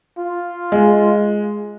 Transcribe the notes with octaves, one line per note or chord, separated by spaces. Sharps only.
F4
G#3